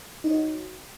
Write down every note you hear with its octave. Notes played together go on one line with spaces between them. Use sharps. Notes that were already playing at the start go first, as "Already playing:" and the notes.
D#4 F#4 C#5 D#5